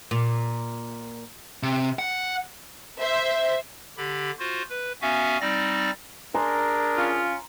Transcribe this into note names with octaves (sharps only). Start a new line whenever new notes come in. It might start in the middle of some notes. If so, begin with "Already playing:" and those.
A#2
C3
F#5
C5 E5
D3 G4 B5
F4 F#4 C5
B4
B3 C#4 F#4 E5 F5 G#5
G3 C4 D#4 D5 A#6
D4 G#4 A#4 G#5 A#5 C6
C#4 F4